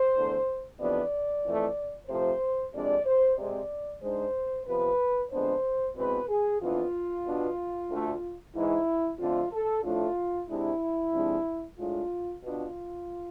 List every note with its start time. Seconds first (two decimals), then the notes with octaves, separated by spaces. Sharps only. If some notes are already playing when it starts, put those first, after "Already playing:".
Already playing: C5
0.14 E2 D3 A3
0.78 F2 C3 E3 B3 D4 D5
1.44 F2 E3 A3
2.07 C3 F3 A3 C5
2.73 F2 C3 G#3 D4 D5
3.05 C5
3.37 C3 G#3 C4 D5
4.02 G#2 G#3 D4 C5
4.66 C3 F3 B3 B4
5.31 F2 D3 G#3 B3 D4 C5
5.95 E2 B2 G#3 C4 B4
6.28 G#4
6.60 F2 E3 B3 D4 F4
7.25 B2 B3 D4
7.89 D2 D3 A3
8.54 G#2 E3 G#3 E4
9.18 F2 D3 A3 C4 F4
9.51 A4
9.83 A2 F3 A3 D4 F4
10.48 C3 G#3 D4 E4
11.12 F2 C3 F3 G#3 D4
11.77 A2 G#3 D4 F4
12.42 B2 B3 D4 F4